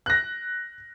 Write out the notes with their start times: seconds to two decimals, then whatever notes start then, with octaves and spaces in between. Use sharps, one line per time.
0.06 F#6 A#6